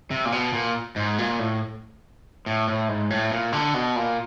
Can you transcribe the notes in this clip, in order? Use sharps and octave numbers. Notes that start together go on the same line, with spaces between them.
C3
A#2
B2
A#2
G#2
A#2
A2
A2
A2
G#2
A2
A#2
D3
B2
A#2